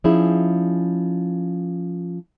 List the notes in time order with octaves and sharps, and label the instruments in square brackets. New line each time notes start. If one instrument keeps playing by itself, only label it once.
[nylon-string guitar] F3 C#4 D#4 E4 G#4